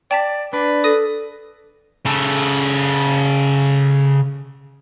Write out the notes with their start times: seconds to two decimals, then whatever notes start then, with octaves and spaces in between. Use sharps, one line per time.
0.11 D5 G5 A5 B6
0.53 D4 B4
0.84 A4 D#6 A#6 D#7
2.06 C#3 A4